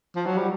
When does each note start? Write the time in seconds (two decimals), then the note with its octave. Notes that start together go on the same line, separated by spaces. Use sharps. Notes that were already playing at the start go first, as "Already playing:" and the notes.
0.16 F3
0.26 F#3
0.37 G3